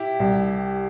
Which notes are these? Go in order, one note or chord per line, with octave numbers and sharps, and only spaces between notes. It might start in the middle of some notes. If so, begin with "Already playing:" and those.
Already playing: E4 G4
C2